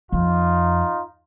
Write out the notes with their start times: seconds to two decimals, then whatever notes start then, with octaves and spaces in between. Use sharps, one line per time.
0.12 F2 D#4 F4